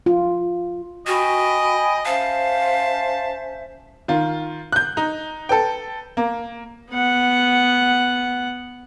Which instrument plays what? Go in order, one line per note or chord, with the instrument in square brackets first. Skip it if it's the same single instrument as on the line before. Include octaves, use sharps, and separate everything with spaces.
[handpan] F4
[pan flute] F#4 [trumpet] D#5 [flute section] G5 G#5 B5
[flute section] C#4 C5 E5 [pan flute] F5 [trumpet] A5
[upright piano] D#3 F4
F#6 G6
D#4
A4 B4 G5
A#3
[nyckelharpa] B3 F#5